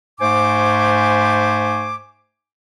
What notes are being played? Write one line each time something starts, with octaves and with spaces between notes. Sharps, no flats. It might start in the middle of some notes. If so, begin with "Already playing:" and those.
G#2 A3 C5 G#5 D6